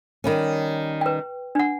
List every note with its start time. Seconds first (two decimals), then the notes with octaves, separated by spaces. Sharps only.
0.24 D#3 G3 C#4
1.01 B4 G5
1.55 D4 F#5